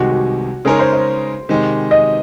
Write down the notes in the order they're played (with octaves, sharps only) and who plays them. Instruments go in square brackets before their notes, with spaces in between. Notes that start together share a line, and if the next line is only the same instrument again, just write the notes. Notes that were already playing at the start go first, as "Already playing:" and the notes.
Already playing: [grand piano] C2 C3 D#3 G#3 [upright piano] F#4
[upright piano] F#4
[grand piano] C#3 G#3 D#4 A#4 C#5 [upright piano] G#4
[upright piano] C5
C5
[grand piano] C3 D#3 G#3
[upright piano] D#5